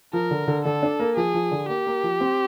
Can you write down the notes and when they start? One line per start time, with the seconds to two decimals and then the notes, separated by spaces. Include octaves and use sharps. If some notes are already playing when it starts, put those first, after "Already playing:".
0.13 F3 A#4
0.31 D3
0.48 D3
0.65 D3 A4
0.83 D4
1.00 A#3
1.17 F3 G#4
1.34 F3
1.51 D3
1.69 A#3 G4
1.87 A#3
2.03 F3
2.21 C4